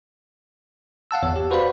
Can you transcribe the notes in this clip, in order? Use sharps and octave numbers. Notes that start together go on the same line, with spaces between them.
F5 F#5 A5 E6
G1 E2 C#5
G4
F#4 B4 C5 D5 F5 B5